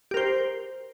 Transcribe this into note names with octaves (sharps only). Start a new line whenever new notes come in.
G4 A#4 C5